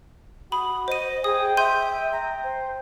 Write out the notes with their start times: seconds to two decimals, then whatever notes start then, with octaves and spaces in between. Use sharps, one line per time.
0.52 F#4 B5 D#6
0.88 C5 D#5 D#7
1.24 G#4 G5 D#6
1.57 E5 C6 G6 D#7
2.12 A#5
2.44 C5